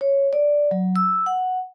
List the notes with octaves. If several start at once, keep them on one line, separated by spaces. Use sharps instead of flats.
C#5
D5
F#3
E6
F#5